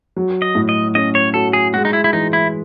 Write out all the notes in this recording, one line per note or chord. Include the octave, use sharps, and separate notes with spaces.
F#3
D#5
A2
D#5
C#4 D#5
C#5
F#4 A4
G#4
G#3 F#4
D#4
E4
E4
E3 D#4
E4